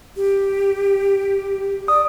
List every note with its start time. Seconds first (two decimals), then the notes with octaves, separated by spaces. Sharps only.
0.16 G4
1.88 D5 D#6